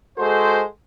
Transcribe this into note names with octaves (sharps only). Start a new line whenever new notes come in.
G#3 F#4 A4 C5